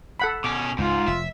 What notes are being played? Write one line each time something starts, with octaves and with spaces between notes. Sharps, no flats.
A4 F#5 B5
B2 C#4 D6
C#2 G#2 F4
F1 E5